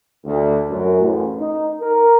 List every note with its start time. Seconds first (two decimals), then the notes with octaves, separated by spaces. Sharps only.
0.25 D2
0.69 F#2
0.99 A1
1.38 D#4
1.80 A#4